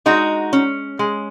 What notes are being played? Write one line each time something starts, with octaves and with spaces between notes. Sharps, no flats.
G#3 D#4 F#4
C#4
G#3